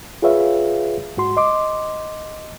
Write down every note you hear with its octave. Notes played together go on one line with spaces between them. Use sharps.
F4 G#4 B4 C#5 E5 F5
G#2 F#4 C6
D#5 C6 D6